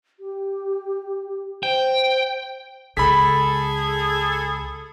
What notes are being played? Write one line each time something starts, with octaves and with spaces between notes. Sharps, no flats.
G4
C5 G5
C#2 G#4 A4 B5 B6